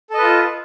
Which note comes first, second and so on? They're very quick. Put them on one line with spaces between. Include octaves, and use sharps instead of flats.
A4 D#5 B4 F4